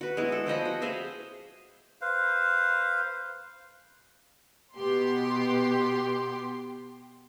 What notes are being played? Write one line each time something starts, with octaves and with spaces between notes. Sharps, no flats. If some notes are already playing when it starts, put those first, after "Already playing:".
F#4 B4
G#3 B3 E4
A4
F3 C5 D#5 B5
F#4
G#4 C5 E5 F5
B4 C5 F5
B2 B3 G4 C6